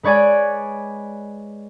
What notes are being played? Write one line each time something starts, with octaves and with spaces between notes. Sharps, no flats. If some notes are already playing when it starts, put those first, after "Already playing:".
G#3 B4 C#5 D5 G#5